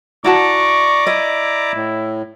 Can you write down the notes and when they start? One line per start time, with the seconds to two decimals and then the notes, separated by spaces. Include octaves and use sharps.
0.24 E4 F#4 D5 A5 A#5 C#6 D6
1.07 E4 D#5
1.75 A2